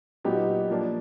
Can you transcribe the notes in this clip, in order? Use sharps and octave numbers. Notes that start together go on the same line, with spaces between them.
A#2 F#3 B3 D#4 G4
F3 A#3 D4